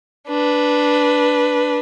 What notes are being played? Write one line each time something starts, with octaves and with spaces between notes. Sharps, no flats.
D4 B4